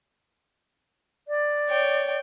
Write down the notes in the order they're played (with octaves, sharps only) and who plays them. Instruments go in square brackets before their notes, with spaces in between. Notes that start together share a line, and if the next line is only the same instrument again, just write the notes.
[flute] D5
[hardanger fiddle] C#5 G5